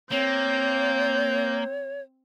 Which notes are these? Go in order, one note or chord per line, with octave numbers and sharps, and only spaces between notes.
A#3 C4 C#5 G6